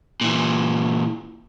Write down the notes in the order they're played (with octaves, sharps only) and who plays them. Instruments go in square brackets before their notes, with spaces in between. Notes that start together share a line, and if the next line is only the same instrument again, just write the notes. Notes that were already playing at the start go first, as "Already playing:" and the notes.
[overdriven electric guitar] A#2 E3